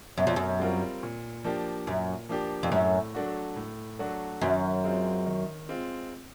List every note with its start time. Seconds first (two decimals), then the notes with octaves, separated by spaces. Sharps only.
0.18 F#2 B2
0.27 F2
0.36 F#2
0.60 G3 C4 F4 A#4
1.03 A#2
1.44 F3 A#3 D4 G4
1.87 F#2 A#2
2.29 F3 A#3 D4 G4
2.63 F2
2.71 F#2 A2
3.15 F#3 A3 D4 F#4
3.56 A2
3.99 F#3 A3 D4 F#4
4.41 F#2 D#3
4.84 G#3 C4 F4
5.26 D#3
5.69 G#3 C4 F4